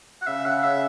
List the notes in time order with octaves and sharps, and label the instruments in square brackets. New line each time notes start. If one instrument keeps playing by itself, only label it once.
[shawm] F#5
[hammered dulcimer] C#3 [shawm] E5
[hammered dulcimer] C#3 [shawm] F#5
[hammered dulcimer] C#3 [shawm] E5